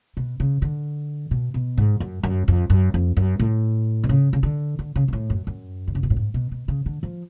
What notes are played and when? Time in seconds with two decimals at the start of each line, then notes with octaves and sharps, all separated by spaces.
0.17 B2
0.40 C#3
0.62 D3
1.31 B2
1.54 B2
1.77 G#2
2.00 F#2
2.23 F#2
2.48 F2
2.70 F#2
2.94 F2
3.17 F#2
3.40 A2
4.04 B2
4.09 C#3
4.33 C#3
4.43 D3
4.79 D3
4.96 C#3
5.08 B2
5.13 A2
5.30 F#2
5.47 F#2
5.88 D3
5.95 C#3
6.03 B2
6.10 A2
6.16 G#2
6.34 B2
6.52 B2
6.68 C#3
6.86 D3
7.03 F3